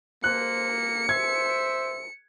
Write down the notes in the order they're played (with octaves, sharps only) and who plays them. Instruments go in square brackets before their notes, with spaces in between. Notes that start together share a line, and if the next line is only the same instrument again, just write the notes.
[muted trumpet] A#3 [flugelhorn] C5 [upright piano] F#6 [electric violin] C#7
[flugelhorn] C5 [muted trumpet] E5 [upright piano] G#6